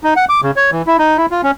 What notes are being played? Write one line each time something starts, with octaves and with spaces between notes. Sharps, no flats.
D#4
F#5
D6
C#3
C#5
E3
E4
D#4
E4
F4
C#4